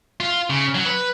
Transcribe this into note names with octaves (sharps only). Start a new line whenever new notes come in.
F4
C#3
F#3
B4